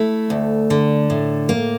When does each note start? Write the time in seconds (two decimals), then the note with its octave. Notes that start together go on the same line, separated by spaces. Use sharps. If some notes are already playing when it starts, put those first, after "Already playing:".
Already playing: A3 E4
0.30 D2
0.70 D3
1.10 A2
1.49 A#3